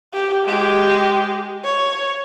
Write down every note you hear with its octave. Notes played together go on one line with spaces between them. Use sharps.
G4
G#3 G4
C#5